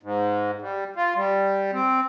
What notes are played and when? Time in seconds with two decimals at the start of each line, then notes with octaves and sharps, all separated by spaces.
0.03 G#2
0.61 G3
0.96 F4
1.16 G3
1.72 C4